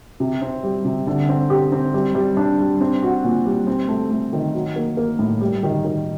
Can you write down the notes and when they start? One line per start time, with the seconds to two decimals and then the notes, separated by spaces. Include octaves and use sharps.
0.20 C3
0.42 C4
0.63 G3
0.85 C3
1.07 D3
1.29 C4
1.50 G4
1.72 C4
1.94 G3
2.15 G3
2.37 D4
2.59 G3
2.81 C4
3.03 F#4
3.24 A#2
3.46 G3
3.67 C4
3.88 A3
4.11 A3
4.33 D#3
4.54 F#3
4.76 A#3
4.97 A#3
5.19 A2
5.41 G3
5.63 D#3
5.85 D#3